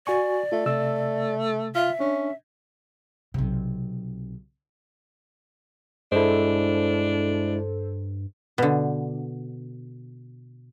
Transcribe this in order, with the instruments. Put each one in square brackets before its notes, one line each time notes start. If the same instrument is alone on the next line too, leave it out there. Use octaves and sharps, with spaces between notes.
[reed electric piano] F#4 G#5 C#6 [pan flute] D5
[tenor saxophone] A3 [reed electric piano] F4
[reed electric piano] C3 E6 [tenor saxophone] A3
[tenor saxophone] F4 [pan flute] E5
[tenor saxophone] C#4 [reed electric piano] D4
[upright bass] B1 C3
[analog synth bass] G2 [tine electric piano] G#3 E4 [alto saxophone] D4 [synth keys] A4 C5
[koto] B2 D3